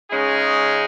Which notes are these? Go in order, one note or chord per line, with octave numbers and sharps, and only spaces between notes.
C#3 G#3 C#4 D#4 G#4